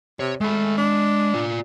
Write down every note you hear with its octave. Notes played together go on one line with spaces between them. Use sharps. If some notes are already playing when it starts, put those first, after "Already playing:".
C3 C#5
G#3 A3 B5
D4
F4 D5